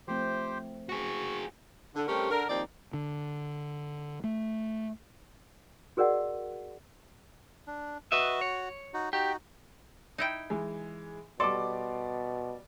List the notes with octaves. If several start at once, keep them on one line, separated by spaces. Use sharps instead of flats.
F3 A3 C4 G4 C5
F#4 G#4 C#6
D3
G3 A3 C4 C#4 G4 A#4
D3 A#4
D#2 F3 A#3 C4 D#4 D5
D3
A3
F#4 G#4 A#4 D5 D#5 F#5
D4
F#4 B4 D#5 E5
C#5
D#4 F#4
D#4 F#4 G4
D#4 E4 G5
E3 G#3
B2 G3 A4 D5 C6 D6